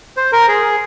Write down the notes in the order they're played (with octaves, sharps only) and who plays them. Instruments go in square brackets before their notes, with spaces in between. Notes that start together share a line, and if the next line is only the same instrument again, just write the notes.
[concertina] C5
A#4
G#4